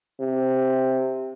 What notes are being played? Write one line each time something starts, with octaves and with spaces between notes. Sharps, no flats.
C3